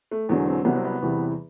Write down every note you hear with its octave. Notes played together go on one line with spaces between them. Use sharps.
A3
E1 E2 D3 F#3
C4
C2 C3 F#3 B3
C4
B3
E2 C3 E3 G3